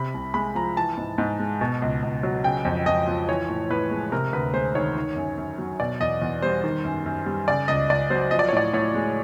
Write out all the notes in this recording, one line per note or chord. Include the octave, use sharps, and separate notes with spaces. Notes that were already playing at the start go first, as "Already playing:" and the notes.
Already playing: C3 B5
C2
G#3 B5
F3 A#5
E3 A5
G#2
G#2
G#3
B2
C#2
C#2
F#3
C#3 G5
F2
F2 D#5
F3
E3 C#5
A2
A2 B4
G#3
C3 A#4
D2 B4
G#3 C5
D#3 C#5
D#3
F#2
F#2
F#3
B2 D5
E2 D#5
E2
G3 C5
D#3
F#2
F#2
G3
C#3 D5
C#2 D#5
C#2 D5
F#3 C5
F3 D#5
D5
C#5
A2 D5
A2 C#5
G#3